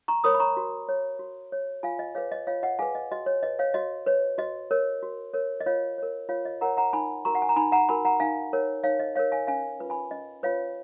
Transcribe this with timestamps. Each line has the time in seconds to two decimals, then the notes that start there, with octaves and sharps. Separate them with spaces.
0.08 A#5 C#6
0.24 A#4 C#5 B5 D#6
0.35 B5
0.40 A#5 C#6
0.57 F#4
0.89 C#5
1.19 F#4
1.52 C#5
1.83 F4 F5 G#5
1.99 D#5
2.15 G#4 B4 C#5 F5
2.32 D#5
2.47 F4 C#5 F5
2.63 D#5 F#5
2.79 G#4 B4 F5 G#5
2.95 D#5
3.11 F#4 D#5
3.26 C#5
3.43 B4 D#5
3.59 C#5 F5
3.74 F#4 D#5
4.06 B4 C#5
4.38 F#4 D#5
4.71 A#4 C#5
5.03 F#4
5.34 A#4 C#5
5.61 D#5
5.66 F4 C#5 F5
5.98 A#4 C#5
6.29 F4 C#5 F5
6.45 D#5
6.61 A#4 C#5 F#5 A#5
6.77 F#5 A#5
6.93 D#4 G#5 B5
7.25 F#4 A#4 A#5 C#6
7.35 F#5
7.42 G#5
7.49 A#5
7.56 D#4 G#5 B5
7.72 F#5 A#5
7.89 F#4 A#4 G#5 B5
8.05 F#5 A#5
8.20 D#4 F5 G#5
8.53 A#4 C#5
8.84 D#4 C#5 F5
9.00 D#5
9.15 A#4 C#5 F5
9.32 F5 G#5
9.47 C#4 F5 G#5
9.80 F4 B4
9.90 G#5 B5
10.11 C#4 D#5
10.43 F4 B4 C#5 F5